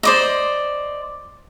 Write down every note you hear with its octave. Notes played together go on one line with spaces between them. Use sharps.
C5 D5 D#5